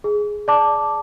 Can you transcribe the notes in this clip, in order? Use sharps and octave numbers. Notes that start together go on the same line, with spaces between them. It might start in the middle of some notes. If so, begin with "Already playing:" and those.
G#4
D5 A5 D6